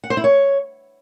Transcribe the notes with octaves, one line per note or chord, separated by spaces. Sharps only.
F#5
C5
E4
C#5